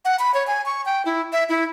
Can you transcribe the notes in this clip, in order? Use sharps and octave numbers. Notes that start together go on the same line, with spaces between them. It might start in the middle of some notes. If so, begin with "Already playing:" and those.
F#5
B5
C#5
G#5
C#6
G5
E4
E5
E4